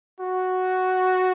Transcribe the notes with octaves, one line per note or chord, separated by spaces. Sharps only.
F#4